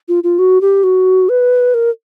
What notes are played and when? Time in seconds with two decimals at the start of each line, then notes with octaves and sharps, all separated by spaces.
0.08 F4
0.24 F4
0.39 F#4
0.61 G4
0.84 F#4
1.29 B4
1.74 A#4